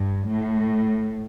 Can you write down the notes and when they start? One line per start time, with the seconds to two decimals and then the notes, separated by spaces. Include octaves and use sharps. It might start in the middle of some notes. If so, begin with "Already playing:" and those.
Already playing: G2
0.29 A2